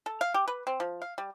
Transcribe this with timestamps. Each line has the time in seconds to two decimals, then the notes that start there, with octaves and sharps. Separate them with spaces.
0.06 A4
0.21 F5
0.34 G4
0.48 B4
0.67 C4
0.80 F3
1.02 F5
1.18 G3